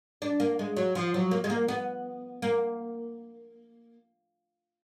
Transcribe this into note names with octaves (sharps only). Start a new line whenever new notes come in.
D4
A#3
G#3
F#3
F3
F#3
A#3
G#3
A#3
B3
A#3